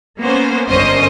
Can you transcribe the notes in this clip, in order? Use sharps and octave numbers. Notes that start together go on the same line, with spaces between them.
A#3 B3 C#4 C5
G1 D3 C#4 A#4 C5 D#5